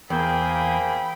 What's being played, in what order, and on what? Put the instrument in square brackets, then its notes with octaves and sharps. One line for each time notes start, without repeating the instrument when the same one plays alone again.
[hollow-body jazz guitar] E2 [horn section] A#3 C4 G#4 [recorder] G5 [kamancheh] B5